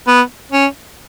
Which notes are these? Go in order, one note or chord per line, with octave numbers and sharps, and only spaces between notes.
B3
C#4